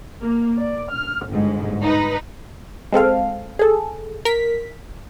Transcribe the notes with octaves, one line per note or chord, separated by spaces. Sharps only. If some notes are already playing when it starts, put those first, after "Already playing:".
A#3
D5
F6
G1 G#2
D#4 B4
G#3 C4 A4 F5
G#4 A4
A#4 B6